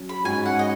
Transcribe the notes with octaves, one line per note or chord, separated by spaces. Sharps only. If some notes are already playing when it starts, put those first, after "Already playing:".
Already playing: F#3 C#4
B5
G#2 G#3 C#4 F#4 G#5
F#5
D#5